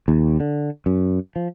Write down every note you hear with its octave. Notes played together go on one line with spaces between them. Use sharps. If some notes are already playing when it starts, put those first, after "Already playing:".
D#2
D3
F#2
F3